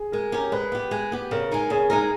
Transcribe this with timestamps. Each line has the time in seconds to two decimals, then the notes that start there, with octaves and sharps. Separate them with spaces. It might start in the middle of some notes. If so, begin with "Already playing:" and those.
Already playing: G#4
0.12 G#3 A#4
0.32 C#4 G4 A#4
0.52 G#3 B4
0.72 B3 G4
0.91 G#3
1.12 B3 G4
1.31 C#3 A#4
1.51 G#3 D#4 A#4
1.70 C#3 G#4
1.90 G#3 D#4 A#4